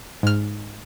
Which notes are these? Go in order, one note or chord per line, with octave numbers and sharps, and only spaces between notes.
G#2 F6